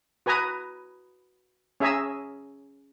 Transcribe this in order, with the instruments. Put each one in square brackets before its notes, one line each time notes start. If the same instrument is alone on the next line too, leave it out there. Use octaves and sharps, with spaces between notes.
[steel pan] F#4 B4 G#5 A#5 D#6
C#4 G#4 E5 G#5 A#5 E6